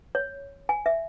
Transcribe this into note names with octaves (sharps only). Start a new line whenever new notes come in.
C#5
G#5
E5